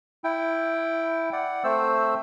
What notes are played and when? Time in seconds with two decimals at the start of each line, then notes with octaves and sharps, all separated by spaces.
0.24 E4 G5
1.33 D5 F#5
1.64 A3 C4 C5 E6